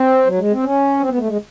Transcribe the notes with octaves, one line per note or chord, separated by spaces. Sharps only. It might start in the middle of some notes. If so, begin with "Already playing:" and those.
Already playing: C4
F#3
G#3
C4
C#4
C4
B3
A3
G#3